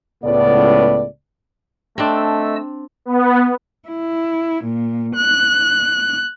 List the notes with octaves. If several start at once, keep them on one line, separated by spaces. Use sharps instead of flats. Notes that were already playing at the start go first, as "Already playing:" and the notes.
C#2 A2 B3 D5
A3 C4 D4 D#5 A5 E6
B3
E4
A#2
F#6